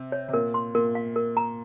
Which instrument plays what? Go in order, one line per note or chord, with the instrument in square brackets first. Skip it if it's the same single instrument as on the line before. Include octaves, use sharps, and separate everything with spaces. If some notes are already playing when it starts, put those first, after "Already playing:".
Already playing: [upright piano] C3
[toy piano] C#5
[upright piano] C3
[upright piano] A#2 [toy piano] A#4
[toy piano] C6
[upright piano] A#2 [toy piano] A#4
[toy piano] F5
A#4
A#5